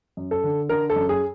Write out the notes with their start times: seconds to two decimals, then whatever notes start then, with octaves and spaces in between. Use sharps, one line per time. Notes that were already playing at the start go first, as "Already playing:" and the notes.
0.17 F#2
0.31 A4
0.44 D3
0.69 D3 A#4
0.90 A4
0.96 F#2
1.09 G#4